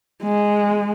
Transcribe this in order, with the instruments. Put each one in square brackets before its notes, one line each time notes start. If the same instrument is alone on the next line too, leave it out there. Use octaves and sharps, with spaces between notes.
[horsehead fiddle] G#3